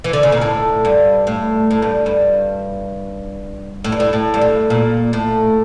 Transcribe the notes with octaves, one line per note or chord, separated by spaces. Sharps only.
E3
D3
C#3
A#2
A2
G2
A2
A2
G2
G2
A2
G2
A2
A2
G2
A2
A#2
A2